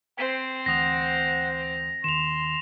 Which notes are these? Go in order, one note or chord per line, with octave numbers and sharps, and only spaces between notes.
C4 C5 G5 G#6 B6
D2 E3 F#5 D#6 A#6 F7
D#2 D#3 C6 E7 F7